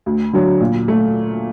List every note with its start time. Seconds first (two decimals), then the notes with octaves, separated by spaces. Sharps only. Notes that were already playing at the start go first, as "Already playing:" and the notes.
0.06 D2
0.33 D3 F#3
0.60 A#2
0.88 A3